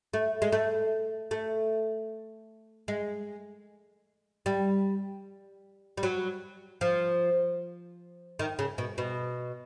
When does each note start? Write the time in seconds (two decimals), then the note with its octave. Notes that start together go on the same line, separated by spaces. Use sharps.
0.14 A3
0.42 G#3
0.52 A3
1.31 A3
2.88 G#3
4.46 G3
5.97 G3
6.03 F#3
6.81 F3
8.39 D#3
8.59 C#3
8.78 B2
8.98 B2